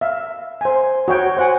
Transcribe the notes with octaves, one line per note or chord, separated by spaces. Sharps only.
E5 F5
C5 G#5
F#4 C#5 G5
C5 F#5 G#5